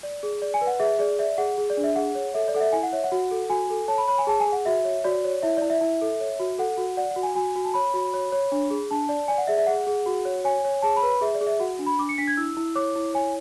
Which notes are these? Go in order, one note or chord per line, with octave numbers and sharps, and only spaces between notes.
D5
G#4
D5
G#5
B4
F#5
G#4 E5
G#4 D5
D5 E5
G#4 F#5
G#4
D5
D4
E5
G#4 F#5
C#5
A4 E5
D5
A4 F#5
E5
E4 G#5
F#5
C#5 E5
F#5
F#4
A4
F#4 G#5
A4
C#5 A5
B5
C#5 B5
G#5
G#4 A5
G#5
G#4
F#5
F#4 E5
C#5
F#4 D5
C#5
E4 E5
E4 D5
E5
E4
A4
C#5
F#4
A4 F#5
F#4
D5 F#5
F#5
F#4
G#5
F#4 G#5
F#4
A5
C#5 B5
F#4
C#5
C#5
D4
G#4
D4 A5
D5
D5 G#5
F#5
G#4 E5
E5
G#4 F#5
G#4
F#4
C#5
C#5 G#5
C#5
G#4 A5
B5
B4
B5
G#4 E5
D5
G#4
E5
F#4 F#5
D4
B5
D4 D6
C#7
D4 B6
G#6
E4 E6
E4
C#5 D6
E4
C#5 G#5